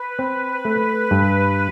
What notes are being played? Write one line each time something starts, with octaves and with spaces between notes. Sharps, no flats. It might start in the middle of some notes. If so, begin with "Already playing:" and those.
Already playing: B4
C4
A3
G2